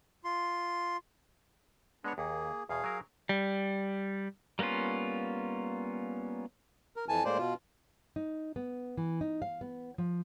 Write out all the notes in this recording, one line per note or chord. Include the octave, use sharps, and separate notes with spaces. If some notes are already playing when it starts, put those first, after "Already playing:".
F4 C6
G#3 B3 D4 C#5
D#2 A#3 G#4
E2 B2 G#4 F5
F#3 A#4
G3
G3 A#3 B3 C#4 F4
A#4
F2 E3 G#5 A5
A2 G#3 A#3 C5 D5
B2 F4
D#4
B3
E3
D#4
F5
B3
F3